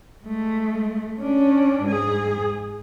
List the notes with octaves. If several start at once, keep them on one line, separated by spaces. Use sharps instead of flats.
G#3 A3
C#4 D4
G#2 G#4